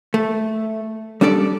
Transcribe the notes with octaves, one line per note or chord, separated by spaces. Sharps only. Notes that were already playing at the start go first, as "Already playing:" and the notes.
A3
G3 C#4 D4 A4 D5